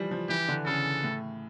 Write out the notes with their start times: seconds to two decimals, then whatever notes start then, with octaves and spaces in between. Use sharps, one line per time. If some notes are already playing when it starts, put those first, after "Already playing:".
Already playing: E3 F3 G3
0.11 F3
0.29 E3 G4
0.48 D3
0.66 C#3 A4
1.03 A2